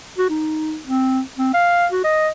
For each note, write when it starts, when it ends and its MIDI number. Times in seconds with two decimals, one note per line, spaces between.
0.18 0.28 66
0.29 0.78 63
0.86 1.20 60
1.38 1.51 60
1.53 1.87 77
1.92 2.04 66
2.04 2.29 75